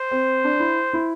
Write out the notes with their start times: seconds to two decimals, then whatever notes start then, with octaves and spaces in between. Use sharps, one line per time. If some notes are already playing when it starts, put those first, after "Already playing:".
Already playing: C5
0.11 C4
0.44 D4
0.60 E4
0.93 E4